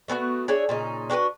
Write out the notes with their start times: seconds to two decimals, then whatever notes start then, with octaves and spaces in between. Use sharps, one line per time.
0.08 A3 B3 C#4 F#4
0.48 D4 G#4 C#5 E5
0.69 A#2 C#3 D#4
1.10 D4 F#4 G4 B4